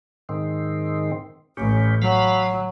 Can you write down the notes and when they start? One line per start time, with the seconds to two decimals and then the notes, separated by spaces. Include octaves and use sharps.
0.29 G#2 D#3 C4
1.57 A1 C#4 G4
2.02 F#3 F5 B5